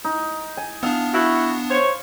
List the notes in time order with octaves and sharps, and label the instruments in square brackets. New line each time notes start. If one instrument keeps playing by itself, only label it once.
[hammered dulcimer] D#4
G#5
[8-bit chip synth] B3 D4 [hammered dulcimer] E5 F5 A5
[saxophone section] E4 F#4
C5 C#5